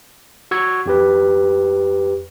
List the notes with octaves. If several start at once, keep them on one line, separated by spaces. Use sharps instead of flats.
F#4 C#6 E6 G#6
F2 G4 B4